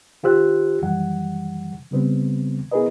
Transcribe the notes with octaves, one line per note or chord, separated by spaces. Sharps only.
D#3 F4 G4 C5 E6 F#6
F#2 D#3 E3 G3 F#5
C#3 G3 B3 C4
B3 E4 G#4 A#4 B4 D#5